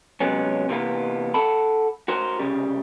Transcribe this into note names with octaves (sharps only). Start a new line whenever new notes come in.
C3 F#3 G#3 B3 C#4
C3 E3 A#3 B3
A4 F#5 A5 B5
F#4 A#4 C5
C2 C#3 G3